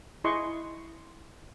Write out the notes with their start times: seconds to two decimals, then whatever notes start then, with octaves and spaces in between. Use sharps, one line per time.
0.24 E4 G#4 D#5 C6 C#6